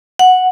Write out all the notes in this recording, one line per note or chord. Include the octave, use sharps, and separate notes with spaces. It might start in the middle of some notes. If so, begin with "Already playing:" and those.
F#5